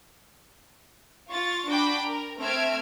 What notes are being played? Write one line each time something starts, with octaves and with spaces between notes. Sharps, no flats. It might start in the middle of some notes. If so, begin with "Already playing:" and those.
F4 C#6 A6
D4 F#4 G5 B5 D6
A#4
A3 C4 E5 F6 G#6 D7